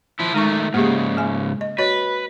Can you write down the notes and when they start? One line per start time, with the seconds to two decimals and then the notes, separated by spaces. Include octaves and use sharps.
0.19 F3 E4
0.34 D#3 G#3 A3 D#4 C#6
0.74 G#2 C#3 A#3 G4 G#4
1.17 G#3 G#5
1.61 D#5
1.78 F#4 B4 C#5 D#5